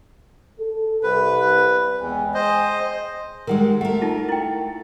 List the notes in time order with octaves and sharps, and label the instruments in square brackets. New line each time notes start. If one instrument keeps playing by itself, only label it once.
[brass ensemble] A4
[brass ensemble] C2 [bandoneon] B4
[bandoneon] E2 [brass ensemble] G#3 G5 G#5
[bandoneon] C5 D#5
[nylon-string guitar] D#3 G3 G#3 [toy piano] A#4 F#5 E6
[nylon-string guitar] A3 A#4 [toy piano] F#5
[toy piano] D#4 F4 A5
E4 G5